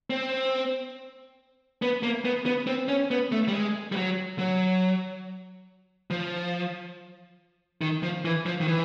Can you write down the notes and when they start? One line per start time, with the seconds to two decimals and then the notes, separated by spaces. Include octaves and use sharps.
0.10 C4
1.82 B3
2.03 A#3
2.25 B3
2.46 B3
2.67 C4
2.88 C#4
3.11 B3
3.32 A3
3.48 G3
3.53 G#3
3.92 G3
3.96 F#3
4.39 F#3
6.10 F3
7.81 D#3
8.03 F3
8.25 E3
8.46 F3
8.61 D#3
8.67 E3